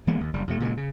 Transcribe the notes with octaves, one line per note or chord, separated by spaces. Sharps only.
E3 G#3 A#3 B3
D#2
F#1 G3
F2 C3 A3
A#2 C#3 E3 G#3
C#3